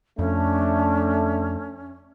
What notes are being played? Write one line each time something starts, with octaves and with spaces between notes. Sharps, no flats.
F2 A3 C#4 D4